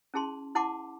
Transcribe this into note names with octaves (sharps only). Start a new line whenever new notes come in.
C#4 E4 G#4 A5 C6
E4 F#5 A5 C6 D6